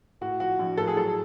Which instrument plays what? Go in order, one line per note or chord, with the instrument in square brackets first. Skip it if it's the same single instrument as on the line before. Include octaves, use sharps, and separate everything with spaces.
[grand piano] A2 F#4
F3 F#4
A#1
A2 A4
G#4
F#3 A4